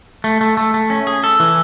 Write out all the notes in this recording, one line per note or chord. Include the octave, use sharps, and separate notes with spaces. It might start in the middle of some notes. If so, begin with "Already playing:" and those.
A3
A3
A3
A3
C#4
G#4
A4
E3